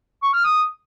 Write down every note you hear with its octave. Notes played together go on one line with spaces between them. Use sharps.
C#6
F6
D#6